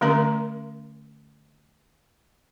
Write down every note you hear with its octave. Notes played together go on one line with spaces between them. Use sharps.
D3 A3 C#4 A#4 A#5